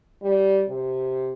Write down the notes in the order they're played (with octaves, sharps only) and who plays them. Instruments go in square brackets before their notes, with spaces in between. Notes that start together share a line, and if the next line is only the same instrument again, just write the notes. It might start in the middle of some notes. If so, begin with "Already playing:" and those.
[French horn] G3
C3